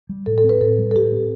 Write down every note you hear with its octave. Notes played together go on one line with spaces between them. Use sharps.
G3
A2 A4
A4
C4
B4
A2 A4
G3
A4
A2 G4
C4